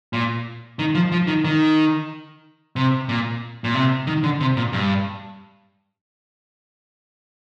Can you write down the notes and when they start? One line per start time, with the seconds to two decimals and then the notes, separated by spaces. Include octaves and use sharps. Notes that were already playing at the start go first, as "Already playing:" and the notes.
0.13 A#2
0.79 D#3
0.95 F3
1.12 F3
1.27 D#3
1.45 D#3
2.76 C3
3.09 A#2
3.64 A#2
3.74 C3
4.07 D#3
4.23 D3
4.40 C3
4.57 A#2
4.73 G2